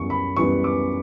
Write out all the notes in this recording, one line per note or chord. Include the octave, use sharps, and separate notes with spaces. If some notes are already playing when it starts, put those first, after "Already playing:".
Already playing: F#2 E3 G3 B3 C#6
B5
F#2 E3 G3 B3 C#6
D6